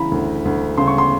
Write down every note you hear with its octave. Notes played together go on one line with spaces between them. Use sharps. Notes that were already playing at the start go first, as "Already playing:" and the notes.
Already playing: C#3 E3 A#5 B5
D2
D2
C#3 C6
C#6
C6